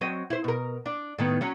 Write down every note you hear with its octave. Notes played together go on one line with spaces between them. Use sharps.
F#3 C4 D#5
E4 C5
B2 A#4
D4
A2 D#3 B3
F#3 C#4